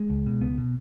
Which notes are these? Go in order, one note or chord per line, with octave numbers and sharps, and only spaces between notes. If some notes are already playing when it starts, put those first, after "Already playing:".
Already playing: G#3
C#2
B2
C#2 B3
B2